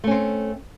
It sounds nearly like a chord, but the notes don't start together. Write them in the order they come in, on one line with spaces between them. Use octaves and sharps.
A3 C#4 C4